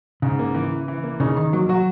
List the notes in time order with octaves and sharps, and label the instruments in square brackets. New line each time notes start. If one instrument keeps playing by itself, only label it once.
[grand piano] G#2 [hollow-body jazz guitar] C#3
[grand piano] A#3
E3
E3
E3
A#3
[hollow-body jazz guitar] C#3 [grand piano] D#4
[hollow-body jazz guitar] D#3 [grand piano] D#4
[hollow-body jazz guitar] F#3 [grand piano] A#3
[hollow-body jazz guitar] F#3 [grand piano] F#4